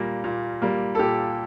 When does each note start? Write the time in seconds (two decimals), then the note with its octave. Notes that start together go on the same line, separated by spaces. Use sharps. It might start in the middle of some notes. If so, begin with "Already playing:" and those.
Already playing: A#2 G3 A#3
0.24 A#2
0.62 G3 A#3
0.95 A4
0.99 A#2 G4